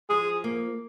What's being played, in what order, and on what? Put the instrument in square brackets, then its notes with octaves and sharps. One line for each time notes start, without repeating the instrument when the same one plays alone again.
[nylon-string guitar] F3 [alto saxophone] G#4
[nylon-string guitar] A#3